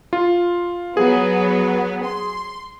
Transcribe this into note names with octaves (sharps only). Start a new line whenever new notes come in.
F4
F#3 B3 G#4
C6